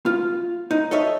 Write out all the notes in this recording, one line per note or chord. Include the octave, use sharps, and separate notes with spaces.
F4
D#4
A4 C#5 D#5 E5